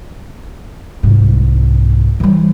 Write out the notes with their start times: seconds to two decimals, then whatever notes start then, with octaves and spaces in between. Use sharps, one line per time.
1.03 C2 G#2
2.20 E3 G3